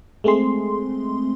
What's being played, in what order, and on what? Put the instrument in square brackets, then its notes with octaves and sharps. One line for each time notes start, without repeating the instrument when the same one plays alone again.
[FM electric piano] G#3 A3 C4 G#4 C6